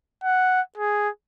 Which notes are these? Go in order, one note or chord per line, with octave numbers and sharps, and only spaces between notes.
F#5
G#4